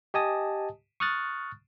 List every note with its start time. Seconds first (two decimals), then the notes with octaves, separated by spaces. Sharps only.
0.14 G4 D#5 G#5 A5 D#6
1.00 C#6 D#6 F6 F#6 A6